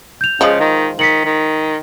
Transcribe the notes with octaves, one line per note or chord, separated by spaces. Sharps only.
G6 F7
C#3 F3 G#3
D#3
D#3 B6 C#7 F#7
D#3